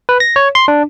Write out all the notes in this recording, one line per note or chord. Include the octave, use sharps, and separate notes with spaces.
B4
A#6
C#5
C6
D4